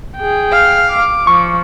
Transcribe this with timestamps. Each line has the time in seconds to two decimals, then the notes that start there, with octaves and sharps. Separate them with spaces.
0.18 G#4 G5
0.52 F5
0.90 D6
1.27 F3 C#6